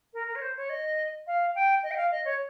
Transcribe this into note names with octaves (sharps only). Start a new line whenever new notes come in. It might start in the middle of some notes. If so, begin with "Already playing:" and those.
A#4
A#4
C#5
C5
C#5
D#5
F5
G5
D#5
G5
F5
D#5
C#5